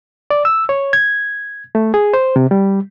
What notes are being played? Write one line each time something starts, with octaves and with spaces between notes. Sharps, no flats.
D5
E6
C#5
G#6
A3
G#4
C5
C3
G3